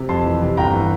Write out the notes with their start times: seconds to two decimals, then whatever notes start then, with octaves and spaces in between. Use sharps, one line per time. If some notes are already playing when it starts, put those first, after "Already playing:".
Already playing: C3
0.09 F2 A5 C6
0.25 E3
0.41 C3
0.57 G1 G5 A#5
0.73 E3